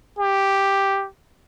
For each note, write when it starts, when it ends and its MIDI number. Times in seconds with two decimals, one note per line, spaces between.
0.19 1.07 67